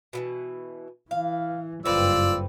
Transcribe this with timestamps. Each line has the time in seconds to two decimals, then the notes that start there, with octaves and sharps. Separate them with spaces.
0.13 B2 D3 E3
1.11 E3 F5
1.85 F#1 G2 C4 F4 A4 B4 D5 E6